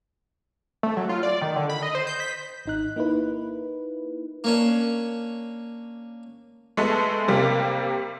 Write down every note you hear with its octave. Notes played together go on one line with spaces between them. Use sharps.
A3
F#3
F4
D5
D#3
D3
B5
D#5
C5
G6
B6
G#1 D#4 F#6
A#3 D#4 E4 B4
A#3 C#4 D4
G#3 A3 B3 A4
C3 G3 A#3